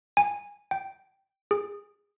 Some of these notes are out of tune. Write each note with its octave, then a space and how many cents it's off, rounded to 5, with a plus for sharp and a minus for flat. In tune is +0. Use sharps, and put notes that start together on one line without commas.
G#5 -20
G5 -10
G#4 -20